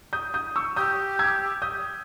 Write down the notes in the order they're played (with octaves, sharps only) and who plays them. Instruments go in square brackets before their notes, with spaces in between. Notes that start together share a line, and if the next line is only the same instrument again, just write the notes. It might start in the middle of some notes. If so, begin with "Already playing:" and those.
[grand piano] D#6 G6
D#6 G6
C#6 E6
[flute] G4 [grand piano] D#6 G6
[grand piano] E6 G#6
D#6 G6